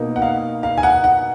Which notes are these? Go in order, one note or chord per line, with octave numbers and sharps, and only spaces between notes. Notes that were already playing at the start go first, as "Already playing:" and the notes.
Already playing: B2 A#3 D#4
F#5
F5
F5
G#5
F#5
F#5